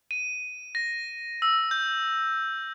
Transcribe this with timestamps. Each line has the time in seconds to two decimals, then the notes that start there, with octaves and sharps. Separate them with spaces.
0.11 D#7
0.75 A#6
1.42 E6
1.71 G6